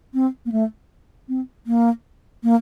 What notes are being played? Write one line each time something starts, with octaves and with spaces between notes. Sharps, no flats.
C4
A#3
A3
C4
A#3
A#3